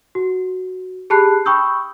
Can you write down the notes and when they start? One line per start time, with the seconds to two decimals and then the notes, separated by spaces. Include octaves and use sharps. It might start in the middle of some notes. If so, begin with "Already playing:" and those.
0.15 F#4
1.10 G4 G#4 A5 B5 F#6 C7
1.45 G5 B5 C#6 D#6 E6 G6